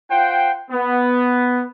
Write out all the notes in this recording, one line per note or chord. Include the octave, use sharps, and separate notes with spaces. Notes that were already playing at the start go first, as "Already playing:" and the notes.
F4 C5 F#5 G5
B3